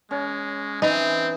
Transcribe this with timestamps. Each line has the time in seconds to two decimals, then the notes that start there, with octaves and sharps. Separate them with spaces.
0.11 G#3 C#4
0.82 E3 C4 D#4